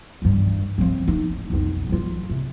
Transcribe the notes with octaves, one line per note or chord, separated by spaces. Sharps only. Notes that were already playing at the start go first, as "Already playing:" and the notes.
G2 D#3
F3 C4
D#4
B1 F2
F#3 F4
C3